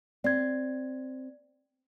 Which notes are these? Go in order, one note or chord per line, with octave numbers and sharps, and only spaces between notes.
C4 D5 G#6